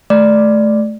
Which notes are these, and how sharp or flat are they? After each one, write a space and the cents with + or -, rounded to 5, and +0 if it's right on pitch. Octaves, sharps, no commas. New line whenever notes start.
A3 -20 D5 +0 D6 +0